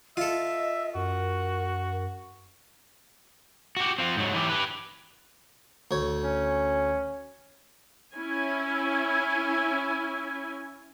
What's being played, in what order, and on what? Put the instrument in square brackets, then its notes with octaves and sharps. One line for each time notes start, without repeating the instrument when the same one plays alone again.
[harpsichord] F4 A4 [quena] D#5 [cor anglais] E5
[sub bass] F#2 [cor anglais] F#4 [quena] A#4
[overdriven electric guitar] F#4 G4
C4 F4
G#2 F#3
E3 G4
G4 B4
[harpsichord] D2 C#5
[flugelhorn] C#4
[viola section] C#4 E4 G#5